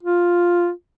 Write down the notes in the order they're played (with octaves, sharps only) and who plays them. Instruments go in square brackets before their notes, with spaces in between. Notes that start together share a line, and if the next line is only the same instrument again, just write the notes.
[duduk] F4